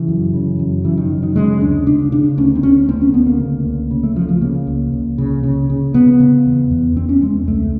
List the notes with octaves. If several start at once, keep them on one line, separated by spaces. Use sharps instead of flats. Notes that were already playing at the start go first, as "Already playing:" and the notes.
Already playing: C#3 E3
F#2
C#3
F#2
C#3 E3
D#3
F#2
D#3
C#3 G#3
D2 D4
C#3 D4
C#3 D4
D2 C#4
C4
D2 C#4
D2 C4
C#4
D2 B3
A#3
C#3
C#2
C#3
A3
C#3 F3
F3
C#3 A#3
C#2
C#2
C#3
C#3
C#3
C#3 B3
C#3
E2
E2
E2 C4
C#4
E2 G#3
C#2 A3